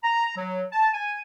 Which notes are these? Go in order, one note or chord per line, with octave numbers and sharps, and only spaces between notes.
A#5
F#3
A5
G#5